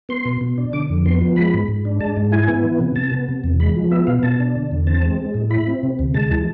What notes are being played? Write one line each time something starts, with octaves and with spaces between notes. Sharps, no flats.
B3 C6
B2
B2
D4
D3 D6
F2
B3 C6
F3
G#3 B5
G#2
G#2
D4
G#3 A5
G#2
E4 G#5
B3
E3
C3
C3 A5
B3
C3
E2
G#3 B5
F3
B3 E5
B2 F5
B2 A5
D4
D3
E2
C4 A5
G#3
G#3
A2
E4 B5
C4
C3
D2
G#3 A5
E3